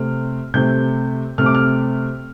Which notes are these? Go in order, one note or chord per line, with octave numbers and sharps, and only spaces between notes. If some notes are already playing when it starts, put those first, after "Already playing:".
Already playing: C3 A3 C4 F6
C3 A3 C4 G6
C3 A3 C4 F6
D6
F6